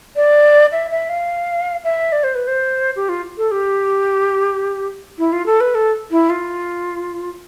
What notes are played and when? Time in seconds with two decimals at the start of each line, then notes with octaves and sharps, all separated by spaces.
0.16 D5
0.72 E5
0.91 E5
1.09 F5
1.84 E5
2.12 D5
2.23 C5
2.35 B4
2.47 C5
2.96 G4
3.09 F4
3.38 A4
3.51 G4
5.18 E4
5.32 F4
5.46 A4
5.60 B4
5.75 A4
6.11 E4
6.30 F4